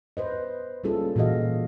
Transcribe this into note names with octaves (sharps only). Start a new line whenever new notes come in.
B4 C5 D#5
G3 A#3 C#4 F4 G#4 A4
A#2 E3 F#4 G#4 D#5 F5